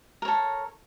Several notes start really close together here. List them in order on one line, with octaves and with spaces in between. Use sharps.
A#4 C#5 A4